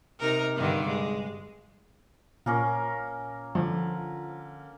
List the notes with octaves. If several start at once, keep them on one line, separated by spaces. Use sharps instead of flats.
C3 D#4 A#4
G2 D3 D#3
G#3
A#2 A#3 C#4 A#4
D3 F3